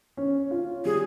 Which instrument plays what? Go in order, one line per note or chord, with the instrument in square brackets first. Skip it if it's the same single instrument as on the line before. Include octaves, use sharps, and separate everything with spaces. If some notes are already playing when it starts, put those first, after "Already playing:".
[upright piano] C#4
F4
[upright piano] G3 [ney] G#4